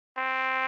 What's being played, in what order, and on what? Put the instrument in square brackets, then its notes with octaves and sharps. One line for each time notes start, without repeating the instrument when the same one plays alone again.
[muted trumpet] C4